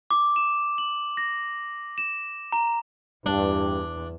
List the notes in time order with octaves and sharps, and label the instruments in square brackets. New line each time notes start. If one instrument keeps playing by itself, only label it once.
[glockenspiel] D6
E7
F#7
A#6
E7
A#5
[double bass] E2 [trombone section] G2 [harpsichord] D4